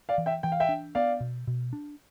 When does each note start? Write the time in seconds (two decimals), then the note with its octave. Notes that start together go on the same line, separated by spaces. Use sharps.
0.09 D5 F5
0.18 E3
0.26 E5 G5
0.43 E3 G5
0.52 F5
0.60 E5 G5
0.69 D4
0.95 B3 D5 F5
1.20 B2
1.47 B2
1.73 D4